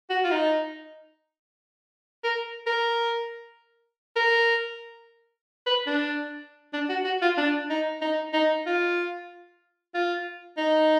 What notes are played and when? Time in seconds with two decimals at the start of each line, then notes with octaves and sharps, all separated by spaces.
0.10 F#4
0.24 F4
0.31 D#4
2.24 A#4
2.67 A#4
4.16 A#4
5.66 B4
5.87 D4
6.73 D4
6.89 F#4
7.05 F#4
7.22 F4
7.38 D4
7.70 D#4
8.02 D#4
8.33 D#4
8.66 F4
9.95 F4
10.58 D#4